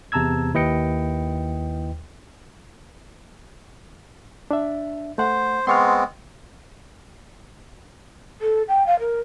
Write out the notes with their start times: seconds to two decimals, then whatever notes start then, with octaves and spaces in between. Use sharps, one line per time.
0.12 E2 C3 A5 A#5 E6 G#6
0.54 D#2 E4 B4 D#5 G5 C#7
4.51 D4 E5
5.18 A3 C5 F#5
5.67 G#3 B3 C4 C6 C#6 F6
8.41 A4
8.68 G5
8.86 F5
9.00 A#4